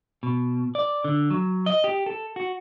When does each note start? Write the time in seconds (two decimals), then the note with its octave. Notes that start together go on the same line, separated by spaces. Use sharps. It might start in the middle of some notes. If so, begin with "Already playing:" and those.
0.23 B2
0.75 D5
1.04 D3
1.30 F#3
1.66 D#5
1.84 G4
2.06 A4
2.36 F#4